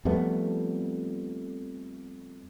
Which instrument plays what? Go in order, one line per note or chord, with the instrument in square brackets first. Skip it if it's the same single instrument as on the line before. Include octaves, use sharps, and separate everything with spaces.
[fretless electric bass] F2 G3 A3 B3